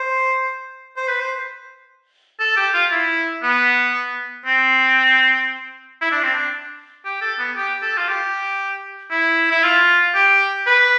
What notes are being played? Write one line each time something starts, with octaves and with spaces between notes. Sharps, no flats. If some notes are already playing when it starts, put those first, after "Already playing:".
Already playing: C5
C5
B4
C5
A4
G4
F4
E4
B3
C4
E4
D4
C4
D4
G4
A4
B3
G4
A4
F4
G4
E4
E4
F4
G4
B4